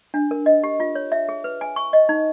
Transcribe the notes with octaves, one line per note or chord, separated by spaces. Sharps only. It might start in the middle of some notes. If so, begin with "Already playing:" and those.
D4
A#4
D#5
G4
F4
C#5
E5
G#4
B4
G#5
C#6
D#5
D#4